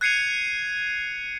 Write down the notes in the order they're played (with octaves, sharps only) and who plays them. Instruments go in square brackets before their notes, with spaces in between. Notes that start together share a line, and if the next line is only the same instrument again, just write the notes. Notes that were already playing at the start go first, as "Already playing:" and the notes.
[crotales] F#6 G#6 C7 C#7 D#7 F7